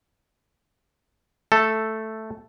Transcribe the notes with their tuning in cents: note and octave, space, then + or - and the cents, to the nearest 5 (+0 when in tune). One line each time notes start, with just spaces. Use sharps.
A3 +0 A4 +0